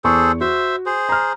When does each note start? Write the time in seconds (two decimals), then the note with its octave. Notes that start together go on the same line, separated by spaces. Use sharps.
0.04 E2 G#4 A4 C5 C#6
0.41 F#4 C5 E5
0.86 G#4 C5
1.09 A#5 F6